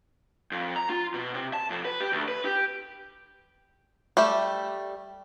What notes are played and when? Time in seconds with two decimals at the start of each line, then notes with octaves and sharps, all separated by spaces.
0.52 F2
0.76 A#5
0.90 F4
1.14 B2
1.34 C3
1.53 A5
1.70 F2
1.85 B4
2.00 G4
2.12 D2
2.28 B4
2.45 G4
4.17 G3 A3 G4 E5